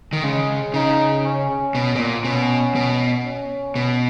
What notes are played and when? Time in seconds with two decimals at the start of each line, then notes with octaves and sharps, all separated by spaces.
0.13 D#3
0.23 C#3 G#3
0.74 C#3 D#4
1.24 C#4
1.75 B2
1.95 B2
1.99 A#2
2.24 B2 C#4
2.75 B2
3.25 C#4
3.75 B2